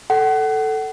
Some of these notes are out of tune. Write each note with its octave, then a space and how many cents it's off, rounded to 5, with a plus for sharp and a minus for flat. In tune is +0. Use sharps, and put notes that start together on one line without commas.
A4 +0 F#5 +30